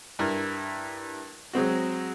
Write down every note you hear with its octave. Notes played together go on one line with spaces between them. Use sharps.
G2 E4 A#4
F#3 G#3 C4 F#4